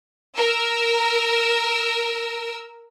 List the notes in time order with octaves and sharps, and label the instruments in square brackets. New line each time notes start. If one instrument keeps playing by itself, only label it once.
[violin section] A#4 E6